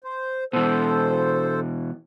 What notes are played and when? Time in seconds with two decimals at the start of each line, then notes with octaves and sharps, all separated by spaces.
0.04 C5
0.53 B2 E3 A4 C5